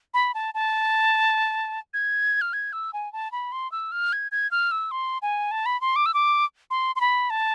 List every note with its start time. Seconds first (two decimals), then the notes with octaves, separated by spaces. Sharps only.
0.14 B5
0.34 A5
0.54 A5
1.94 G#6
2.41 F6
2.53 G#6
2.73 E6
2.93 G#5
3.13 A5
3.32 B5
3.52 C6
3.72 E6
3.92 F6
4.13 G#6
4.32 G#6
4.51 F6
4.71 E6
4.91 C6
5.22 G#5
5.51 A5
5.66 B5
5.81 C6
5.96 D6
6.06 E6
6.14 D6
6.71 C6
6.96 C6
7.01 B5
7.30 A5